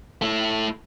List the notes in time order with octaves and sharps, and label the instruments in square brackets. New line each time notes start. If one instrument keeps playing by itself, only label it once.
[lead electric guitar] A3 E4